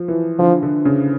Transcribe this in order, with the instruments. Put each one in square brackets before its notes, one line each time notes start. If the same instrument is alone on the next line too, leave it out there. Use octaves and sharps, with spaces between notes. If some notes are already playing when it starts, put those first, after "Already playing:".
Already playing: [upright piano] F3
E3
[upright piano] D3 [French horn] F3
[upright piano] D3
C#3